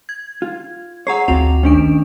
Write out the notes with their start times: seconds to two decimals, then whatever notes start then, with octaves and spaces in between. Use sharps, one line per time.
0.09 G#6
0.42 F4
1.07 G#4 C#5 F#5 A#5 C7
1.28 G#1 D2 C4 F4 F#4 F7
1.63 D#3 A3 C#4 D4 D7